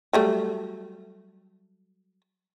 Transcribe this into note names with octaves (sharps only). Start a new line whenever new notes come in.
F#3 G3 A3